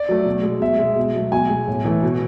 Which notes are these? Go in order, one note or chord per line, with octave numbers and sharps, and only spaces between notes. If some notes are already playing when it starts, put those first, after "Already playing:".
Already playing: D5
F#3 A3
B2
G#3
B2 E5
G#3
B2
F#3 A3
B2 G#5
G#3
A2
E3 A3
B2